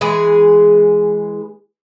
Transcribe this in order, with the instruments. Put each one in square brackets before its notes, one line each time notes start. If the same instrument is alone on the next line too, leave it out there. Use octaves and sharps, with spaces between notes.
[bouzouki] E3 G#3 G#4